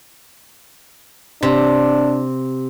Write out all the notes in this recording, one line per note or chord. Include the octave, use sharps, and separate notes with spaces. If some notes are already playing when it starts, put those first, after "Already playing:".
C3 D4